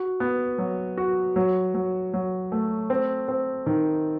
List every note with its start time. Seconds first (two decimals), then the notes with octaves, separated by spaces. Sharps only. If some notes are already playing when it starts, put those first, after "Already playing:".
Already playing: F#4
0.20 B3
0.58 F#3
0.98 F#4
1.36 F#3
1.75 F#3
2.14 F#3
2.52 A3
2.90 C4
3.28 C4
3.66 D#3